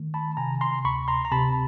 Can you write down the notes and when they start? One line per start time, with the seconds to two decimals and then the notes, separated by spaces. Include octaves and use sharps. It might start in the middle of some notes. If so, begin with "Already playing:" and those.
Already playing: D#3 A3
0.14 A5 B5
0.37 C3 G#5 A#5
0.61 A#5 C6
0.85 D2 B5 C#6
1.08 A#5 C6
1.25 A#5
1.32 C3 A5 B5